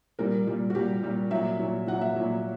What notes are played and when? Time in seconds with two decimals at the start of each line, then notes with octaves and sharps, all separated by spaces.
0.19 A#2 G3 A#4
0.47 A#2 G3
0.70 F#4
0.75 A#2 G3 G4
1.03 A#2 G3
1.31 A#2 F#3 E5
1.59 A#2 F#3
1.88 A#2 F#3 F#5
2.01 E5
2.16 A#2 F#3